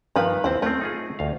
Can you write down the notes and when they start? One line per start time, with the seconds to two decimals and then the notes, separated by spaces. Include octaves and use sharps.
0.16 G2 D#3 F3 B4 F5
0.44 D#2 C4 E4 C5
0.62 A3 C4 C#4
0.81 D#4 F4 G#4
1.19 D2 F5